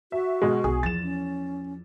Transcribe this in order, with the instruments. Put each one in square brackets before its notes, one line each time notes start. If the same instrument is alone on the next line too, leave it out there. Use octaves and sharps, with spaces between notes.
[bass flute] F#4 [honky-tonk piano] E5
[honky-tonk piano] B2 G#3
[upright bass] B1 [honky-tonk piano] G#4
[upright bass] E2 F3 [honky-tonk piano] A6 E7
[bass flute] C#4